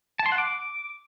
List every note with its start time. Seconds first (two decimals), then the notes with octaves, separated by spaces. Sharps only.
0.19 A5
0.26 C6
0.32 F#5
0.38 D6